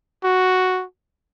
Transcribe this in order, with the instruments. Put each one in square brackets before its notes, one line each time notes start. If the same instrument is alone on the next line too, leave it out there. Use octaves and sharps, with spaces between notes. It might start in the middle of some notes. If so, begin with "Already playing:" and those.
[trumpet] F#4